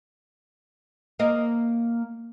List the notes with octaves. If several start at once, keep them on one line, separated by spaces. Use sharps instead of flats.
A#3 D#5